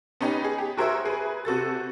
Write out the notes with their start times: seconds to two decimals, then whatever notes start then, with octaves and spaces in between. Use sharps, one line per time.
0.21 B3 C#4 D#4 G4
0.44 G#4
0.58 G4
0.77 F#4 G#4 A#4 C5 C#5 E5
1.05 G#4 B4
1.45 C3 F#4 A4 A6